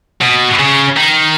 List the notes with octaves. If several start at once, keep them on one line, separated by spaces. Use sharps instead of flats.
B2
C#3
D#3